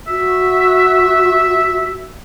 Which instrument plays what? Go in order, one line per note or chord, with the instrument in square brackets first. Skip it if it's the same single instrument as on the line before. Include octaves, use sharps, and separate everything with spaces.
[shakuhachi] F#4 [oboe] E5